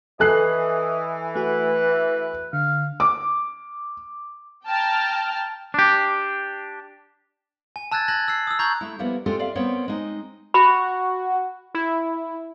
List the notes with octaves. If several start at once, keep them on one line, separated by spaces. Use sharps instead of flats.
E3 A4 D#5 G#5 F#6 C7
A3 F#4 B4
D3 F5
D6
G5 A5 A#5 F6
D4 G4
G#5
A5 E6 F#6 G#6 A6
F#6 G#6 A#6 F#7
E6 C7
D#6 E6
A#5 C#6 G6 G#6 F#7
A3 E4
F3 G3 A#3 B3 E4 A#4
G#3 C4 F4 G4 A4 A#4
F4 D5 E5 F5
G3 B3 C4 A#4 C#5
G#3 C4 D#4
F#4 B5
E4